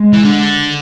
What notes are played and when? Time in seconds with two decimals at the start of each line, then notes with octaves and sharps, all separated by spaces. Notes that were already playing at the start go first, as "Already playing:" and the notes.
Already playing: G#3
0.13 E3
0.24 D3